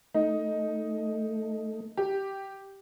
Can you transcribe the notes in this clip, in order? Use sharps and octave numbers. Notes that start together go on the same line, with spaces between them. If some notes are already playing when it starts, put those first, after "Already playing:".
A3 D#4
G4